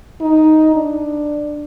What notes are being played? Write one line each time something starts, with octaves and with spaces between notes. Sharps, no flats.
D#4
D4